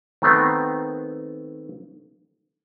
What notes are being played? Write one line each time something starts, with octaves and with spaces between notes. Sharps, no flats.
D#3 A3 B3 C4